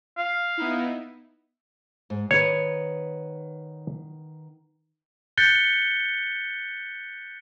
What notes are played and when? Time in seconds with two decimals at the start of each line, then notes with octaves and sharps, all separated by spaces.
0.18 F5
0.57 B3 D#4 E4
2.10 G#2
2.31 D#3 B3 B4 C#5
5.37 F#6 G6 A6 B6 C#7 G7